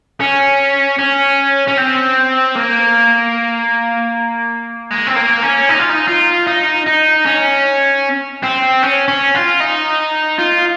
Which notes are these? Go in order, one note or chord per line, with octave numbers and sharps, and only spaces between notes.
C#4
C#4
C#4
C4
A#3
G#3
C4
A#3
C#4
D#4
F4
D#4
F4
D#4
D#4
C#4
C4
C#4
C#4
F4
D#4
F4